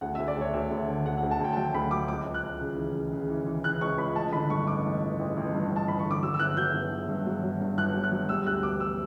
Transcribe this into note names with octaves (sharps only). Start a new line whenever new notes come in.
D2 F#5
D2 E5
D5
D2 C#5
D2 E5
D2
D3
D2 F#5
F#5
D2
A5
D2 G5
A5
F#3 G5
D2 B5
F#3 D6
C#2 D6
C#2
F#6
C#2
C#3
E3
C#3
C#3
E3
E3
C#3 F#6
C#2 C#6
C#2 B5
A1 A5
D3 B5
G2 C#6
A1 D6
A1
A1
A1
A1
G2
A1
A5
A1 B5
C#6
D3
D6
F#3 E6
E6
G1 F#6
F#3 G6
G1
G1
G2
F#3
F#3
G2
G1 F#6
F#3
F#6
F#3
G3 E6
D2 F#6
E1 D6
E6